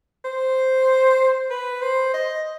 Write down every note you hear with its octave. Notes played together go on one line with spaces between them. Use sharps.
C5
B4
C5
D#5